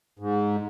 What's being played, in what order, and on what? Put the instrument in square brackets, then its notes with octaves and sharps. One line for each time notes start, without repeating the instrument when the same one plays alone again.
[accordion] G#2